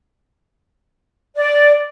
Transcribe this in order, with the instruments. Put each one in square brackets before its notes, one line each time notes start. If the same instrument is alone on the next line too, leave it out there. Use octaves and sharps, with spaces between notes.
[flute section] D5